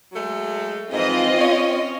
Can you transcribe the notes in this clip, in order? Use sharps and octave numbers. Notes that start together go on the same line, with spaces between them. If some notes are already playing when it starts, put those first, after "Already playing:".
F#3 G#3 A3
G#2 E3 F3 C4 F4 D#5
C#4 C#5